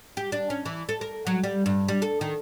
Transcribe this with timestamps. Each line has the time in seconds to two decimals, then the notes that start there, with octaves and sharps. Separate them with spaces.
0.17 G4
0.32 D4
0.50 C#4
0.65 E3
0.89 A4
1.01 A#4
1.27 F#3
1.43 G3
1.66 G2
1.88 G3
2.02 A4
2.21 D#3